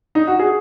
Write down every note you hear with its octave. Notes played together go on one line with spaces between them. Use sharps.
D#4
F#4
G#4